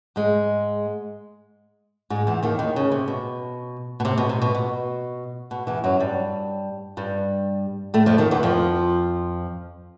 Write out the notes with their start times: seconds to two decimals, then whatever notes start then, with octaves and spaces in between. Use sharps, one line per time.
0.16 G#2 G#3
2.10 G#2 G#3
2.27 E2 E3
2.43 D#2 D#3
2.59 D#2 D#3
2.76 C#3
2.92 C3
3.08 B2
4.00 B2
4.05 C3
4.18 B2
4.29 C3
4.42 B2
4.55 B2
5.51 B2
5.67 E2 E3
5.84 F#2 F#3
6.00 G2 G3
6.97 G2 G3
7.94 A2 A3
8.06 F2 F3
8.18 D#2 D#3
8.31 E2 E3
8.43 F2 F3